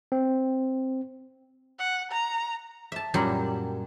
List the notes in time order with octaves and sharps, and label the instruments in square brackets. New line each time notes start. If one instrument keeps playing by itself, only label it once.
[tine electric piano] C4
[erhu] F#5
A#5
[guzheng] E5 A5
F#2 A#2 F#3 G3